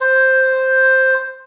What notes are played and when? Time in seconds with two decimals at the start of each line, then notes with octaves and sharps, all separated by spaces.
0.01 C5